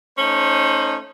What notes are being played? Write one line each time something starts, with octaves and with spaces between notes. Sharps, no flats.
A3 C#4 D#4 C5